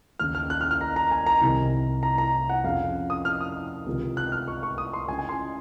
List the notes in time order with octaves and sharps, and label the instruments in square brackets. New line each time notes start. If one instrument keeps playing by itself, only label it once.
[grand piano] D#2 C#3 F6
F6
F#6
F6
F6
A#5
A#5
G#5
A#5
C2 C3 D#3
A#5
A#5
F#5
F2 C#3 F5
D#6
F6
D#6
C#2 C3 D#3
F#6
F6
C#6
C#6
D#6
C6
C#2 C#3 G#5
G#5
C6